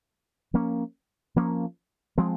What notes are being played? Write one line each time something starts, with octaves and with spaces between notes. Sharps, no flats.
F3 A#3 C#4
F3 A#3 C#4
F3 G#3 C4